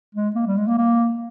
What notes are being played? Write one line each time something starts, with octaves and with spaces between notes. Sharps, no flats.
G#3
A#3
G3
G#3
A#3
A#3